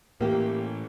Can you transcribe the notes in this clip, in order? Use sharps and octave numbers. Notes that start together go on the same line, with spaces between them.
A2 E3 A#3 G4